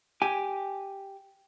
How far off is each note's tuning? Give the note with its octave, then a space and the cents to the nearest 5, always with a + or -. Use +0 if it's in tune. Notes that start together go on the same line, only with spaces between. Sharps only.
G4 +0 G#5 -5